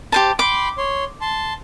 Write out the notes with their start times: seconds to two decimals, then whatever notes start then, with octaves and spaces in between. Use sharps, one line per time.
0.12 G4 C5 A5
0.39 G5 B5 C6 D6
0.78 C#5 C6
1.21 A5 C6